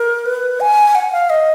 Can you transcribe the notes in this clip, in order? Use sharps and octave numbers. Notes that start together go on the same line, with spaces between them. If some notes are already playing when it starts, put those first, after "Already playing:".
Already playing: A#4
B4
G#5
F#5
F5
D#5